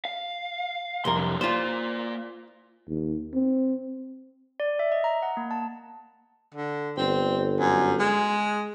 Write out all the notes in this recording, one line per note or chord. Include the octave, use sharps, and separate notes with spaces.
F5
C2 F2 A#4 C6
D3 F#3
A#3 F4 C5 D5
D#2
C4
D5
E5
D#5
A#5
F#5
A#3
A5
D3
G1 C4
F#2
G#3